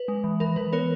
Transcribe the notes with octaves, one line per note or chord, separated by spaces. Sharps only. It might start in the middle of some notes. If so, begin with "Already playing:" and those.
Already playing: B4
G#3
E3
E3 A#4
E3 B4
B3 A#4 C#5